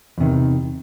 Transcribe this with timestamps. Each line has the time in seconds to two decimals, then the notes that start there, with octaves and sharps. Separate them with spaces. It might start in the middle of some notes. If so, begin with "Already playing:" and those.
0.18 E2 C3 D#3